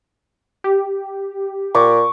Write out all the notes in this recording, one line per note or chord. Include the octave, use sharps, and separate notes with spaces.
G4
A#2 C#6 D6